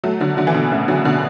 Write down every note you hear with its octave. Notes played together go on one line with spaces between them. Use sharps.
F#3 A3
D3 F#3
D3 F#3
E3
B2 D3
A2 C#3
D3 F#3
B2 D3